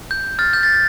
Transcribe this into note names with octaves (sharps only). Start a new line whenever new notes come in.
G6
F6 A6
G6
A6
G6